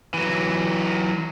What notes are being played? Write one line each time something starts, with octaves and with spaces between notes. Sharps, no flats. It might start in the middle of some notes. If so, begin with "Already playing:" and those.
E3 F#3